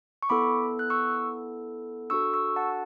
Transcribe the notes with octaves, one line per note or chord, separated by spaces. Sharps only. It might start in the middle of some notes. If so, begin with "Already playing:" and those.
C#6
B3 E4 A4 B5 D6
F#6
C#6 E6
D4 F#4 A4 C#6 E6
C#6 E6
F#5 A5